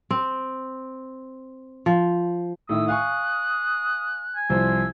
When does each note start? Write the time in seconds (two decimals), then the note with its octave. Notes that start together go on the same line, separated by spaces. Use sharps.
0.11 C4
1.86 F3
2.69 A2 D#3 E4 D#6 E6
2.88 F5 G#5 C#6 F#6
4.35 G#5
4.50 C2 F3 C5 E6